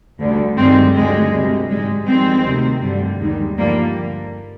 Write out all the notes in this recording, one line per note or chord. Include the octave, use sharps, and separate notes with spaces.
D2 D3 G3
G2 D#3 G3 G#3 C4
D2 D3 G3 G#3
D2 C3 G3
G#2 G3 G#3
F2 D#3 G3 G#3 C4
D2 C3 D#3 G3
G2 D3 G3
D#2 D#3 G3 G#3
G2 D3 F3 G3 A#3